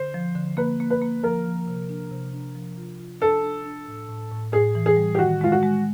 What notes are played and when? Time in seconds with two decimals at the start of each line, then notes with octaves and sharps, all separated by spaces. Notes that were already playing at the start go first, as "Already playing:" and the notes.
Already playing: D3 C5
0.14 F3
0.35 D3
0.57 A#3 B4
0.80 A#3
0.90 B4
1.02 A#3
1.23 F3 A#4
1.46 F3
1.67 C3
1.89 D4
2.11 C3
2.33 D4
2.55 F3
2.77 F4
3.00 F4
3.21 D4 A4
3.44 D4
3.65 D4
3.87 A2
4.09 A2
4.31 A2
4.53 A2 G#4
4.75 E3
4.86 G#4
4.97 G3
5.15 G4
5.19 D#3 F#4
5.41 G#3 F4
5.52 F#4
5.63 G#3